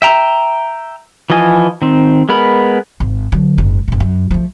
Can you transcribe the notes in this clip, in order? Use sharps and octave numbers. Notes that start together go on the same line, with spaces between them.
E5 G5 A#5
E3 F3 F4 D#5 G#5
D#3 C4
G#3 B3 A#4 B5
G#1
D3 F#3
F#1 G#2
F#1 A#2
F#2
F3 A3